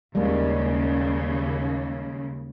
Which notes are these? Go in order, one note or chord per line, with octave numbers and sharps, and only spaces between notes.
D#2 C#3 G3 G#3 A#3